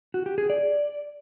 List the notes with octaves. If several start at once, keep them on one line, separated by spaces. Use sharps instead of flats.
F#4
G4
G#4
D5